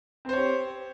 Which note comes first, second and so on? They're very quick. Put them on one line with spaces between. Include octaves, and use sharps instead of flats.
C4 C5 C#5 G4